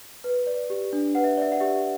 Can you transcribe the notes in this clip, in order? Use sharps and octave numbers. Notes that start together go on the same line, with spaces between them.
B4
D5
G4
D4
B4 F#5
E5
D5 E5
F#5
G4 E5